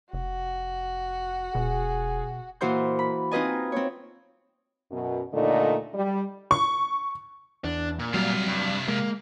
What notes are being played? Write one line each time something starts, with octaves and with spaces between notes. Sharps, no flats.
F1 F#4
E1 B2 G#4
A#2 E3 F#4 C5 C6 G6
B5
C4 D#4 F4 B4 D#5 G#5
C4 C#5
F#2 B2
D#2 A#2 D3 A3 D#4 D#5
G3
C#6
E2 D4
A#2
C3 F#3 G3 F5
G2
G#3 A#3